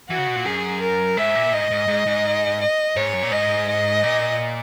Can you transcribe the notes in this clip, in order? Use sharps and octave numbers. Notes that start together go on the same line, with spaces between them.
E3 F#4
C#3
B2
A#2
F#2 G#4
A#4
G#2 E5
A#2
G#2 D#5
G#2
G#2
G#2
D#5
G#2 C#5
F#2
A#2
G#2 D#5
D#5
A#2